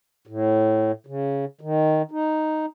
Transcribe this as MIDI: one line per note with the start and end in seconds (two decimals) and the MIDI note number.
0.27 0.92 45
1.07 1.45 49
1.61 2.02 51
2.11 2.66 63